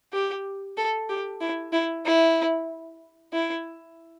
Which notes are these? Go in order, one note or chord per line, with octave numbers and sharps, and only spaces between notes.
G4
A4
G4
E4
E4
E4
E4